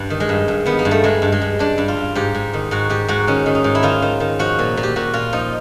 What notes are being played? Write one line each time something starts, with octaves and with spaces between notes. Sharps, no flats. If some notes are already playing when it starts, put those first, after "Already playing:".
Already playing: G2
D#3
G#3
G2
G2
D#3 B3
A#3
G2
A3
G2 G#3
G2
G#3
G2
G2 D4
G2
F4
G2
G#2 G4
G#2
D#3
G#2 F#4
G#2 G4
G#2 F#4
D#3 C#4
D#3
D#4
G#2
E4
D#3 F4
D#3
D#3
F3 F#4
A#2
A#2
G4
A#2 F#4
A#2 F4
F3 D#4